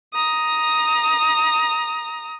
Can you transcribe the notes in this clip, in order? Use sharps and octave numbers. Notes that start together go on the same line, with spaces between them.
A#5 D#6